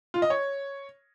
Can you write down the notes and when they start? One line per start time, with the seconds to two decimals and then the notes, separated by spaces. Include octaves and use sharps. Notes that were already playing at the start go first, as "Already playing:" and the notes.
0.14 F4
0.22 D#5
0.30 C#5